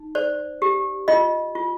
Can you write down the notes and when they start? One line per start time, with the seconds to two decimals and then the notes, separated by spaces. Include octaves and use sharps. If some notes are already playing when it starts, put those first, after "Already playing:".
Already playing: D#4
0.15 C5 D5
0.62 G4
1.08 F4 D#5
1.55 F4